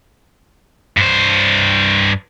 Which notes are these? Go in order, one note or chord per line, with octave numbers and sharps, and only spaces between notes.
G2 C5